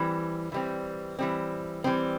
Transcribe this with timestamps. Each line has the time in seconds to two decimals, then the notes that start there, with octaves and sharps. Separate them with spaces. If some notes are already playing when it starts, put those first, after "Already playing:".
Already playing: E3 G3 C4
0.52 E3 G3 C4
1.19 E3 G3 C4
1.84 E3 G3 C4